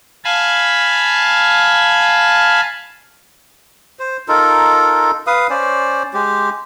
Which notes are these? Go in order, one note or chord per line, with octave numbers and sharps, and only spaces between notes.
F5 G#5 A5 B5
C5
D#4 F4 A4 A#4
B4 F5 D#6
C#4 C5 D5
G#3 G4